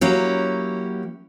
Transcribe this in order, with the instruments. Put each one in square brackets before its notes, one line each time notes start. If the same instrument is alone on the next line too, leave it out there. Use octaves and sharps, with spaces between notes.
[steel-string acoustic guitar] F#3 A#3 C#4 E4 G4